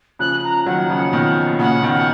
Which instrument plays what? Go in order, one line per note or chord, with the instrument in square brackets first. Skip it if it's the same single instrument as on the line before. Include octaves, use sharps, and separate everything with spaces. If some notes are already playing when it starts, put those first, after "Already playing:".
[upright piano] C#3 F3 [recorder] F#6
[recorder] A#5
[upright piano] D#3 F#3 [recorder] F#5
[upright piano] C#3 F3
B2 D#3
[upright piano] A#2 C#3 [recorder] F#5
[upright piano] B2 D#3
[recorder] F#5